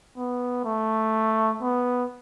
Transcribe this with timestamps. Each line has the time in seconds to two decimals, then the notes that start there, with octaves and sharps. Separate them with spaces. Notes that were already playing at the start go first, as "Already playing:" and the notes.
0.17 B3
0.64 A3
1.61 B3